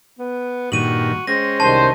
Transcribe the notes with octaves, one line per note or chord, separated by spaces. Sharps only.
B3
G2 A#2 D#3 F#4 D#7 F#7
G#3 C4 C#4 A#6
C2 D#3 C5 A5